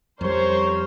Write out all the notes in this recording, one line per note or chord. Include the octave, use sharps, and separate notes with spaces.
F2 G3 C#4 A#4 C5 C#5